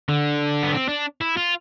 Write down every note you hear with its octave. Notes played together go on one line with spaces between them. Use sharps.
D3
B3
C4
D4
E4
F4